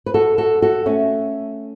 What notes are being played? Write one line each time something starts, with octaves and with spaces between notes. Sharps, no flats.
B4
F#4 A4
F#4 A4
F#4 A4
A3 C#4